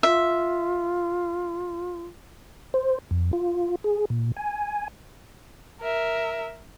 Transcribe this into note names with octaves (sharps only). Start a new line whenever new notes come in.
F4 E5
C5
F2
F4
G#4
A#2
G#5
A#4 E5